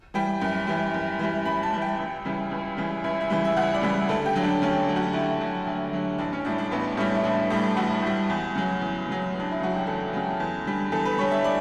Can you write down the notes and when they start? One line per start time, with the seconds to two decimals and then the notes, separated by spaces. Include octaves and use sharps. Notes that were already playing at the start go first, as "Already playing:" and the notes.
0.14 E3 G3 G5
0.41 F#2
0.67 E3 G3
0.94 F#2
1.19 E3 G3
1.45 F#2 B5
1.63 A5
1.73 E3 G3
1.82 G5
1.98 C#2
2.25 C#3 E3 G3
2.51 C#2
2.77 C#3 E3 G3
3.04 C#2 E5
3.21 E5
3.30 C#3 E3 G3
3.45 E5
3.56 C#2 F#5
3.74 D5
3.82 C#3 E3 G3
4.08 D2 A4
4.26 G4
4.35 D3 F#3
4.43 D4
4.62 D2 C#4
4.87 D3 F#3
4.96 F#4
5.13 D2 E4
5.40 D3 F#3
5.67 D2
5.93 D3 F#3
6.18 A1 D4
6.33 C#4
6.45 A2 G3 D4
6.58 D4
6.71 A1 B3
6.97 A2 G3 C#4
7.15 E4
7.24 A1 D4
7.50 A2 G3
7.77 A1 F#4
8.02 A2 G3
8.30 E2
8.55 C#3 F#3
8.81 E2
9.08 C#3 F#3
9.34 E2
9.40 D4
9.51 E4
9.60 C#3 F#3 F#4
9.75 G4
9.86 E2 A4
10.13 C#3 F#3
10.40 E2
10.66 D3 G3
10.92 E2 A4
11.05 B4
11.18 D3 G3 C#5
11.31 E5
11.44 D5